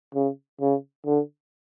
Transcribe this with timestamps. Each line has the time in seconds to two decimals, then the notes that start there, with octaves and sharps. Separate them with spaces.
0.15 C#3
0.61 C#3
1.06 D3